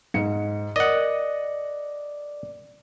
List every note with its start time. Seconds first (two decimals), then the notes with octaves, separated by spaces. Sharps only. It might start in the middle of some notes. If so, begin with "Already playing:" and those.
0.14 G#2 C#7
0.76 A#4 D5 D#5 F#5